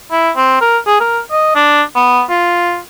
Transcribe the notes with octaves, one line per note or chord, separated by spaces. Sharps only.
E4
C4
A#4
G#4
A#4
D#5
D4
B3
F4